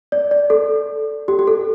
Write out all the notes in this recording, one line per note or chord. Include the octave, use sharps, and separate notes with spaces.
D5
D5
A4
G4
G4
A4